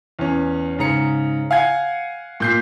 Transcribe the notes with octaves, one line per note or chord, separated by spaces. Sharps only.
E2 C#4
G#2 C#3 A#5 C#7
F5 F#5 G#5 G#6
A#2 G6 C7